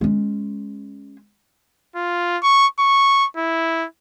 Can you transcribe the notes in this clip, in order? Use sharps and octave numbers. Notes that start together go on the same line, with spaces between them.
G#3 C#4
F4
C#6
C#6
E4